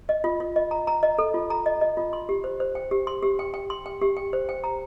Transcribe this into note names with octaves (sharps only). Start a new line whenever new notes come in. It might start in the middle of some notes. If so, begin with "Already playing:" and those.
D#5
F4
F4
D#5
A#5
A#5
D#5
A4
F4
A#5
D#5
D#5
F4
C6
G4
C5
C5
G5
G4
C6
G4
G5
G5
C6
G5
G4
G5
C5
G5
A#5